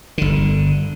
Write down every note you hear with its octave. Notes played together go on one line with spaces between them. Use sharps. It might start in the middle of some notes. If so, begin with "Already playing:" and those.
G1 D3